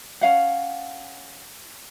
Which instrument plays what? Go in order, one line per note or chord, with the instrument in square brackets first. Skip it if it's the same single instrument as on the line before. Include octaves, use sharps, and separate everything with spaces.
[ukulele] C#4 F5 F#5